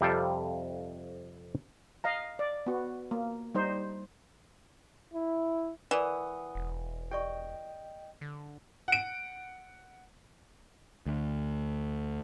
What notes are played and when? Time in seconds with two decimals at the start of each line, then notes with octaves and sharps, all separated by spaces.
0.01 F2 C3 G3 F4 A4 G5
2.04 D#5 F5 A#5
2.39 D5
2.66 B3 F#4
3.11 A#3
3.55 G3 D#4 C5
5.14 E4
5.91 E3 A#4 D5 F#5 D#6
6.55 E1
7.11 G4 D5 D#5 G5 C#6
8.21 D3
8.88 F#5 D7
11.06 D2